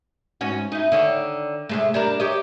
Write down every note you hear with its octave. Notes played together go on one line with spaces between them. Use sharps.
G#2 C#4 F#4
D#4 E4
D3 D#3 C#5
C3 G#3 A3
G3 D4 A#4
G4 C#5 D#5